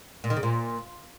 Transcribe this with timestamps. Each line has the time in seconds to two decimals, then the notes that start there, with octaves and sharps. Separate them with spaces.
0.24 A#2
0.30 D#3
0.37 C#3
0.43 A#2